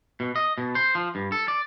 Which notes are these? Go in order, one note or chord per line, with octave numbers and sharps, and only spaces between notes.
B2
D#5
B2
C5
F3
G2
A4
D5